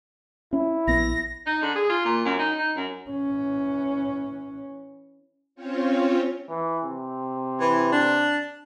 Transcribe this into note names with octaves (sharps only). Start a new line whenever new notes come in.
C#4 E4
A#1 B3 A#6
D#4
D3
G#4
F4
A#2
F#2
D#4
D#4
F#2
E3 C#4
C4 C#4 F4 C#5
E3
C3
E3
D4